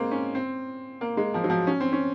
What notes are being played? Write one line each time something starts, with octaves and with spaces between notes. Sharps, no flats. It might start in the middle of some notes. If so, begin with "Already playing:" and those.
Already playing: G#3 A#3 C4
C#4
C4
A#3
G#3
F3
F#3
F3
C#4
C4
C#4